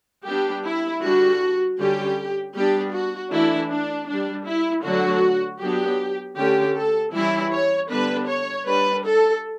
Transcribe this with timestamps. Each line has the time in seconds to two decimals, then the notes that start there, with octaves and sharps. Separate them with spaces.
0.25 G3 B3 D4 G4
0.64 E4
1.01 D3 G3 D4 F#4
1.78 D3 G3 C#4 G4
2.54 G3 B3 D4 G4
2.92 F#4
3.31 E3 A3 D4 E4
3.70 D4
4.08 G3 D4
4.46 E4
4.83 D3 F#3 A3 D4 F#4
5.60 F#3 B3 D4 G4
6.37 D3 A3 C#4 G4
6.75 A4
7.13 E3 G3 C#4 E4
7.52 C#5
7.89 D3 G3 B3 D4 B4
8.28 C#5
8.66 G3 D4 B4
9.05 A4